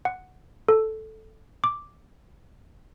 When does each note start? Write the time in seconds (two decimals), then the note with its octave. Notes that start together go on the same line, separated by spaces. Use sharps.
0.05 F#5
0.69 A4
1.64 D6